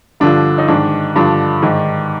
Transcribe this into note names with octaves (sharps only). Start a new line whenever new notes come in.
G2 D3 F3 D4
D#4
G#2 D#3 D4
G2 D3 F3 D4
G#2 D#3